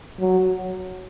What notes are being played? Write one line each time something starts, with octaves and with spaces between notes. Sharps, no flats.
F#3